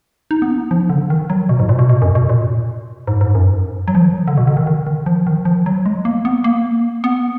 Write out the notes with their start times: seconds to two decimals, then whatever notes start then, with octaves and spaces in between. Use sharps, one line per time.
0.31 D#4
0.42 B3
0.51 D4
0.71 F3
0.90 D3
1.10 D#3
1.30 F#3
1.49 B2
1.59 G#2
1.69 A#2
1.79 B2
1.89 B2
2.02 F#2
2.15 B2
2.29 A#2
3.07 G#2
3.21 G#2
3.35 F#2
3.88 F#3
3.95 F3
4.02 D#3
4.08 F3
4.28 D3
4.37 B2
4.47 D3
4.57 D#3
4.67 D#3
4.87 D#3
5.06 F3
5.27 D#3
5.45 F3
5.66 F#3
5.86 G#3
6.05 A#3
6.25 B3
6.44 A#3
7.04 B3